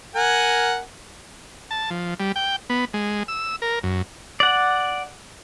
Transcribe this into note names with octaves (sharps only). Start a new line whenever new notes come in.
A#4 F#5 G#5
A5
F3
G3
G5
B3
G#3
E6
A#4
F#2
D5 F#5